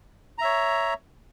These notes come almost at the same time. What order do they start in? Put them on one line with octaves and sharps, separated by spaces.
A#5 E5 C#5